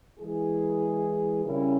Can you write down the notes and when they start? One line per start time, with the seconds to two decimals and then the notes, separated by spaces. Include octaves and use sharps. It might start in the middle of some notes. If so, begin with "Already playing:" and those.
0.19 E3 G#3 E4 G#4
1.44 C#3 G3 C#4 E4 A#4